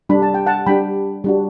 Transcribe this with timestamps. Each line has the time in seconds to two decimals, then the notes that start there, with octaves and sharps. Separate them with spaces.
0.09 G3 D4 G4 B5
0.22 A5
0.34 G5
0.46 F#5 A5
0.66 G3 D4 G4 G5 B5
1.24 G3 D4 F#4